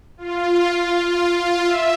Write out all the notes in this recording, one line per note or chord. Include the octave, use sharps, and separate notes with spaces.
F4
F4
F4
F4
E5